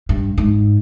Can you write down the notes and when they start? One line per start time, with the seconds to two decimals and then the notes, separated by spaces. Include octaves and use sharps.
0.09 G2
0.38 G#2